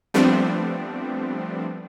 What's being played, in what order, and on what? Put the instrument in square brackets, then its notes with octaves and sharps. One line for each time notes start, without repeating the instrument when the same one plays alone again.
[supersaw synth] F3 G3 A3 B3 C4 D4